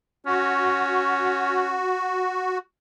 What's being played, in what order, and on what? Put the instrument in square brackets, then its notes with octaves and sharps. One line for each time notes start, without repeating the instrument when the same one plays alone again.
[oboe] C#4 [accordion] F#4